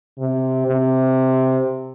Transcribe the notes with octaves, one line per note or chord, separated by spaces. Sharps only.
C3
C3